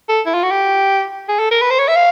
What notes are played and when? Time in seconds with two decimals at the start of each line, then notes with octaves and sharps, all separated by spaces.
0.09 A4
0.26 E4
0.34 F4
0.43 F#4
0.51 G4
1.29 G#4
1.40 A4
1.51 A#4
1.62 B4
1.70 C5
1.79 C#5
1.88 E5
1.96 F5